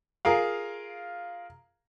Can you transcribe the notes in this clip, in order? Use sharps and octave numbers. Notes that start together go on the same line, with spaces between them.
F4 G#4 A#4 F5